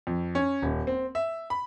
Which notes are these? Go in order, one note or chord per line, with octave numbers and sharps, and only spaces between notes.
F2
C#4
D#1
C4
E5
B5